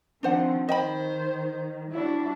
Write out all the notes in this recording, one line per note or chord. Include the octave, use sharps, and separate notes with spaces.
D#3 F3 C4 D4 C5 F#5
D#3 C5 D#5 G5 B5
G3 D4 E4 F#4